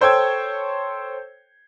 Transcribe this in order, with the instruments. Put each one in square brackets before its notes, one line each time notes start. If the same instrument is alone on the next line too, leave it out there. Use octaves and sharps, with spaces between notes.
[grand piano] A4 C5 C#5 G5 E6 G#6